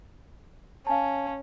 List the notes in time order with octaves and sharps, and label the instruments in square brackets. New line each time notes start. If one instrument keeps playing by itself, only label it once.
[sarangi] C#4 [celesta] F5 G#5 A5